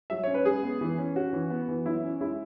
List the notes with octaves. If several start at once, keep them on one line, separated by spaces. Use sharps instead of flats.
F#3 E5
C#4 C#5
B4
G#3 G#4
B3
E3
C#4
C#4 F#4
E3
B3
E3
F#3 E4
C#4
G#3 E4